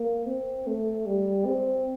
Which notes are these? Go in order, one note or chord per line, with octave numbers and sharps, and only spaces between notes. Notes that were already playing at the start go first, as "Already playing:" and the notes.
Already playing: A#3
C4
A3
G3
C4